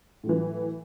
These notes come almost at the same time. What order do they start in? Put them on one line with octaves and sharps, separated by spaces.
A2 F#3 E3